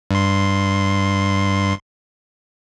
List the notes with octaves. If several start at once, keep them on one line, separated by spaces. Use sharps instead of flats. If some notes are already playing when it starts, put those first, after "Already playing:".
G2 C6